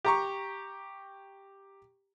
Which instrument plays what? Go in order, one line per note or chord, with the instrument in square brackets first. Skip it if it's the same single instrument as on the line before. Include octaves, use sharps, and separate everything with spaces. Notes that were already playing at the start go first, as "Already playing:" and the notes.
[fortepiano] G4 A#5 C#6